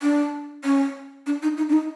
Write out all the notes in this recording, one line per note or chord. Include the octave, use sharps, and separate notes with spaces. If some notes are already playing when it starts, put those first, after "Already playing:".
D4
C#4
D4
D#4
D#4
D4
D#4